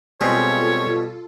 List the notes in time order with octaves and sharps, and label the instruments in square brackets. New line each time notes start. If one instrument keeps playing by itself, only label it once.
[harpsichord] B2 G3 [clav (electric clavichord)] G#3 C4 G#4 [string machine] F4 A4 [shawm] C#5